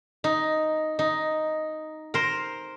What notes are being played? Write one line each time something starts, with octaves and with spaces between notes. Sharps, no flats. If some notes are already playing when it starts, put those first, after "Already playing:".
D#4
D#4
A#4 C5